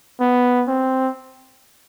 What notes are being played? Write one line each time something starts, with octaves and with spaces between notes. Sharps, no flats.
B3
C4